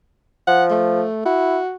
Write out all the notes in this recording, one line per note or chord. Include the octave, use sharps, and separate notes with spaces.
F3 F#5
A3
E4 F#4